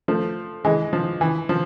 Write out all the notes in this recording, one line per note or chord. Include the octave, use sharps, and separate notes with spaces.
F3 A3
E3 G#3
F3
E3
F3